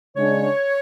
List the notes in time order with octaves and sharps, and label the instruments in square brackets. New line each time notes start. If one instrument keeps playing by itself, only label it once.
[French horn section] C#3 G#3 D4 [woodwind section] C#5